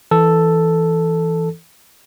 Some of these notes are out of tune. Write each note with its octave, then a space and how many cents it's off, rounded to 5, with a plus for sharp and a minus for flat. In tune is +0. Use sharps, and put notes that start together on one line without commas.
E3 +0 A4 +0